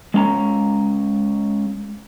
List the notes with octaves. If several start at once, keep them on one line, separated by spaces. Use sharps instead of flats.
G#3 C#4 F5 A#5